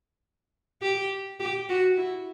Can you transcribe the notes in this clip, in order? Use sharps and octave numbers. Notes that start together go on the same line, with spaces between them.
G4
G4
F#4
E4